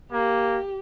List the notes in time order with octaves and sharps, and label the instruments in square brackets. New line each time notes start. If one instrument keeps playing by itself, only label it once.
[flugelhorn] A#3 [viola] G4